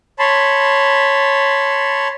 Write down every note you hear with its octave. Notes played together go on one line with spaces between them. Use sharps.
C#5 A5 B5 C6